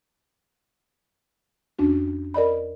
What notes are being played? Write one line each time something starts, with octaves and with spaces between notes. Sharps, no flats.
F2 C#4 D4 F#4
A#4 D5 D#5 B5